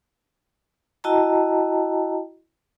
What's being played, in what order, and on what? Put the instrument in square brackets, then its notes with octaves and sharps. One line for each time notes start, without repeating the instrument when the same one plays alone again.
[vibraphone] E4 F#4 D#5 G5 A5 A#5